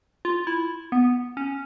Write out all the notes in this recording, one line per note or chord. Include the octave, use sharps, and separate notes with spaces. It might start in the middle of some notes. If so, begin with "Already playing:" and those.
F4
E4
B3
C#4